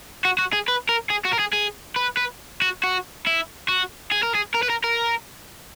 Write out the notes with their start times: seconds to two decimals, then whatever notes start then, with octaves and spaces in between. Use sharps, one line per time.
0.25 F#4
0.38 F#4
0.53 G#4
0.68 B4
0.89 A#4
1.10 G#4
1.25 F#4
1.33 A#4
1.40 G#4
1.53 G#4
1.96 B4
2.17 B4
2.62 F#4
2.83 F#4
3.27 E4
3.68 F#4
4.12 G#4
4.23 A#4
4.35 G#4
4.55 A#4
4.63 B4
4.70 A#4
4.84 A#4